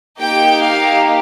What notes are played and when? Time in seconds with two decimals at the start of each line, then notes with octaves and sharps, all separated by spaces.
0.20 A#3 D#4 G4 G5
0.61 F5